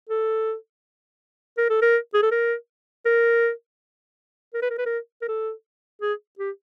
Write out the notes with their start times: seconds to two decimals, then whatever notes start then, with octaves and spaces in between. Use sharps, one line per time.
0.09 A4
1.57 A#4
1.70 A4
1.82 A#4
2.14 G#4
2.23 A4
2.32 A#4
3.06 A#4
4.54 A#4
4.62 B4
4.70 A#4
4.78 B4
4.86 A#4
5.22 A#4
5.28 A4
6.02 G#4
6.39 G4